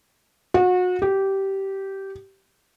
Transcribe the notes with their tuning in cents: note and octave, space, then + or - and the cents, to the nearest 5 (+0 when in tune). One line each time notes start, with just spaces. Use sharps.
F#4 -30
G4 -15